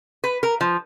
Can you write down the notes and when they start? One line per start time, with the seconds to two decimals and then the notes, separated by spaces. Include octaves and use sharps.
0.24 B4
0.43 A#4
0.61 F3